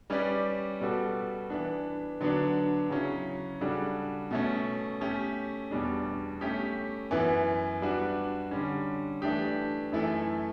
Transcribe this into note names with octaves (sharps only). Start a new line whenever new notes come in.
G3 C#4 G4 B4 D5
B2 G3 B3 F#4 A4
E3 B3 D4
D3 F#3 B3 D4
C#3 F#3 C#4 E4
C#3 G3 D4 F#4 A4
B2 A3 C#4
A3 C#4 G4
E2 B2 G3 D4
A3 C#4 G4
F#2 E3 B3 E4
G3 D4 F#4 B4
D3 G3 C#4
E3 A3 D4 G4
F#2 E3 A3 E4 A4